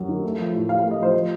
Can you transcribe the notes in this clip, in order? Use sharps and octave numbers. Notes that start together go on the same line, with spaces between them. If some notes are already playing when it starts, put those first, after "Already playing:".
Already playing: F#2 F#3
D#3
A3
F3
A2
A2 F5
F5
A3
D#5
F3 C5
F3